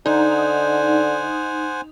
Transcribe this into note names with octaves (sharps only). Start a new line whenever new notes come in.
D3 D#4 C5 F#5 G#5